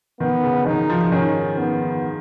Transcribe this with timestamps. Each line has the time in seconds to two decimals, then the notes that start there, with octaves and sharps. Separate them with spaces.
0.20 D#3 B3
0.43 C#3
0.65 D#3 D#4
0.90 F3
1.01 F3
1.12 D#3 C#4
1.58 B3